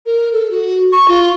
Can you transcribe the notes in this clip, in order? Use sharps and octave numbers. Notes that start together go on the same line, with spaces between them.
A#4
A4
F#4
C#6
F4